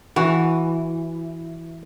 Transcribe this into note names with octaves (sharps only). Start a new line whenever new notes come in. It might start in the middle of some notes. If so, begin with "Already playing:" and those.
E3 F#4